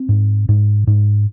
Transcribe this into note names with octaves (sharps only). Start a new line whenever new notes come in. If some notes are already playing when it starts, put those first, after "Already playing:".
Already playing: C4
G#2
G#2
G#2